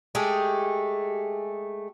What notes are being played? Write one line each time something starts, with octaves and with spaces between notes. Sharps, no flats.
G#3 A3 G4 G#4